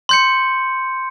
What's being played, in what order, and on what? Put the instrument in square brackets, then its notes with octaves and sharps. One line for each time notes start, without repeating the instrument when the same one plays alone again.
[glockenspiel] C6 G6 C#7